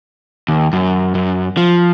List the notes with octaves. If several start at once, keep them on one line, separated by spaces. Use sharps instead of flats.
D#2
F#2
F#2
F3